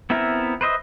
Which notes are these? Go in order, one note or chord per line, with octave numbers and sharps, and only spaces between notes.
B3 C4 E4 A#4 E5
B4 C5 D#5 E5